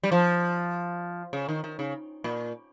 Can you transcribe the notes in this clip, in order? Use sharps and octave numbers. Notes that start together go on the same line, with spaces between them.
G3
F3
C#3
D#3
D#3
C#3
A#2